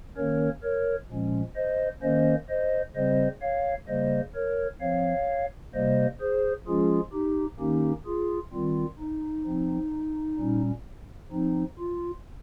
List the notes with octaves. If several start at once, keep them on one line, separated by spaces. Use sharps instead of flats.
D#3 A#3 C#4 A#4 C#5
A#4 C#5
A#2 F3 G#3 C#4
C5 D#5
D#3 A#3 C#4 C5 D#5
C5 D#5
C#3 G3 C4 C5 D#5
C#5 F5
C#3 G3 A#3 C5 D#5
A#4 C#5
F3 C4 C#5 F5
C3 G3 A#3 C5 D#5
G#4 C5
F3 G#3 C#4 F4 G#4
D#4 G4
D#3 A#3 C#4 D#4 G4
F4 G#4
D#3 G3 C4 F4
D#4
F3 C4
A#2 G3 C#4
F3 C4 D#4
F4